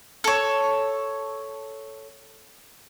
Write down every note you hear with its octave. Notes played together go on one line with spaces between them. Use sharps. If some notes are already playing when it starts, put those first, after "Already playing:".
A4 C#5